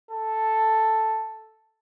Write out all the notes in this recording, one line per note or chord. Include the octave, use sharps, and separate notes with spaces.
A4